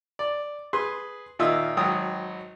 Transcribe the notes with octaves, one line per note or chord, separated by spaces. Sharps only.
D5
G#4 B4 C6
A#2 D#3 F4 D#5 E5 E6
G#1 F#3 G5 D#6